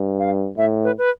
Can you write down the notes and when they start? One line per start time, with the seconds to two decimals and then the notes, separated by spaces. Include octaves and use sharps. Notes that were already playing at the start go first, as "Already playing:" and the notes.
Already playing: G2
0.19 F5
0.57 A2 E5
0.84 B4
0.98 B4